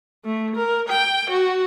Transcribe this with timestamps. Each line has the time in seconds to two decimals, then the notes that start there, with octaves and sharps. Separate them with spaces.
0.25 A3
0.55 A#4
0.88 G5
1.30 F#4